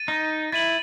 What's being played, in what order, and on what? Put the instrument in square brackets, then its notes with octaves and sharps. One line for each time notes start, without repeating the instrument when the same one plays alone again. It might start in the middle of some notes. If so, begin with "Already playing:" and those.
Already playing: [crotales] A6 D#7
[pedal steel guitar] D#4
[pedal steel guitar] E4 [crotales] A6 D#7 F#7